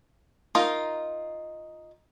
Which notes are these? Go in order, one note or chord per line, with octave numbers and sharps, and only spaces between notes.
D#4 F4 A#4